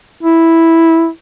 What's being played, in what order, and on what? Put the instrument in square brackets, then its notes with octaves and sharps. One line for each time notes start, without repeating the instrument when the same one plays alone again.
[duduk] E4